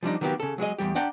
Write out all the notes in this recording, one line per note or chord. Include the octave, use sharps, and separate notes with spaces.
F3 G3 D4 D#4
D#3 F#3 A#3 B3 E4 G4
C#3 A4
F#3 G#3 G#4 D#5
E2 A#2 G3 G4
D4 D5 F#5 G5 A5 A#5